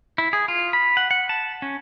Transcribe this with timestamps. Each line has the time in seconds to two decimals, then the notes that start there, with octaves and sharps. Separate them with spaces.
0.18 E4
0.33 G#4
0.48 F4
0.73 B5
0.97 F#5
1.11 F#5
1.29 A5
1.62 C#4